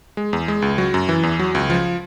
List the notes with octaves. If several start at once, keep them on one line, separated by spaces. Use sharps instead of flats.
G#3
E2
G#3
C#2
F#3
F#2
E3
E2
F#3
C#2
F3